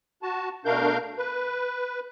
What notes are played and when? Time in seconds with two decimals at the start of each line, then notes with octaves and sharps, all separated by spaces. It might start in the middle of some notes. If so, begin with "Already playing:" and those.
0.22 F#4 A5
0.65 B2 A3 D4 A#4 F5 G6
1.18 B4